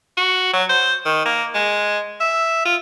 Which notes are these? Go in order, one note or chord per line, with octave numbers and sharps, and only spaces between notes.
F#4
F#3
C5
D#3
A#3
G#3
E5
F4